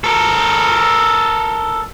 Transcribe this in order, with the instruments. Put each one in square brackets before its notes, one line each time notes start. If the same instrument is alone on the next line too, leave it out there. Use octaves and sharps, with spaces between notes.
[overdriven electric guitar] A4 A#4